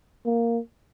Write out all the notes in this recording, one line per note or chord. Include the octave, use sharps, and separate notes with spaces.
A#3